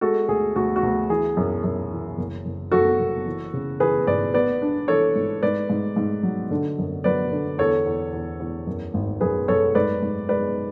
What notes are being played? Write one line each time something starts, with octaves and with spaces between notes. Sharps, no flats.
G#3 F#4 A4
D2 G#4
D2 F#4
F#4
D2
E3 G#4
F#2
F#2
E3
F#1
F#1
F#2 F#4 A4
F#1
E3
C#3
E3 G#4 B4
G#1 B4 D5
B3 B4 D5
D4
E3 A4 C#5
G#2
G#2 B4 D5
G#2
G#2
F#3
D3
F#2
F#3 B4 D5
D3
E2 A4 C#5
E2
E2
E2
F#2
G#1
F#2 G#4 B4
F#2 A4 C#5
G#2 B4 D5
G#2
G#3 B4 D5